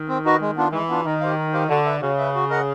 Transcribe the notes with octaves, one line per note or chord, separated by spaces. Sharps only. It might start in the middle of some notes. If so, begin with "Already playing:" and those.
Already playing: D#3
C4
D#4 F#4 B4 D#5
G#3
B3 D4 F4
E3 G#3
B3 D4 F4
D#3 D#4
G4 C5 F5
D#4
G4 C5 F5
D3 F#4
B4 E5
C#3 F#4
B4 E5
F#4
A#4 D#5 F#5